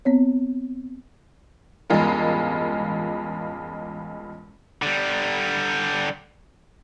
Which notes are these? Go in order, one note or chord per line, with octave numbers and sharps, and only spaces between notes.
B3 C4 C#5
A1 E2 G2 G#3 F4 A#4
D3 G3